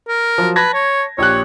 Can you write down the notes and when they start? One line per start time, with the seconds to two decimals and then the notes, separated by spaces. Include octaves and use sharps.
0.08 A#4
0.38 F3 F#3
0.56 B4 A5 G#6 A#6
0.74 C#5
1.18 A#1 G4 C#5 F#6